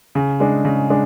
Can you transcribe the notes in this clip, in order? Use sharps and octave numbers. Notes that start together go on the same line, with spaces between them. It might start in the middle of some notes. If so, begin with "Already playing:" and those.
C#3
G#3 D4
C#3
G#3 D4